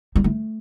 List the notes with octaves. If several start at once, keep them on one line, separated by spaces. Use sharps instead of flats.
G3
A3